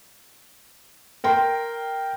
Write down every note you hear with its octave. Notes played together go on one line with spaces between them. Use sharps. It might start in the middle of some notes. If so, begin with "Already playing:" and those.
A#4 G5 C6